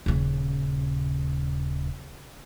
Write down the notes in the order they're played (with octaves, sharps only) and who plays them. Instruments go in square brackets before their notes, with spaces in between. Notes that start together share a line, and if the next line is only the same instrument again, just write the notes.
[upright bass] D#1 C#3